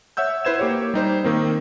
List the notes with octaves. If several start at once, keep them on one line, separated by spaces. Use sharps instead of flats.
C#5 E5 F#5 E6 G6
E4 B4 C5 G#6 E7
A#3 G4 C#5
G3 D#4 C5
D#3 A#3 C4